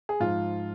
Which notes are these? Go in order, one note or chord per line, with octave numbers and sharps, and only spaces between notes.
G#4
G#2 F3 F4